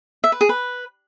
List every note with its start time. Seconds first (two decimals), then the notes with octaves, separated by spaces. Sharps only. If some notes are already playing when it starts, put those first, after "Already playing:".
0.24 E5
0.32 B4
0.41 G#4
0.49 B4